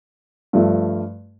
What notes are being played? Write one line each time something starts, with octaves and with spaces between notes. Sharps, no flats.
G2 F3 A3